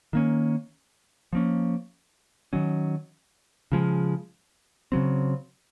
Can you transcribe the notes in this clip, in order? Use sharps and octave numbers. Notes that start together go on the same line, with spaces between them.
D#3 A#3 C#4
F3 A#3 C#4
D#3 F#3 C#4
C#3 F3 G#3
C#3 F#3 C4